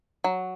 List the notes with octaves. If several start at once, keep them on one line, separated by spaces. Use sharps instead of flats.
F#3